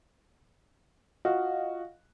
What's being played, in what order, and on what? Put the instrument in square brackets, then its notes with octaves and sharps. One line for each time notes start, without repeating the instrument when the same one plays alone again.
[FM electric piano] F4 D#5 F5 [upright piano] F#4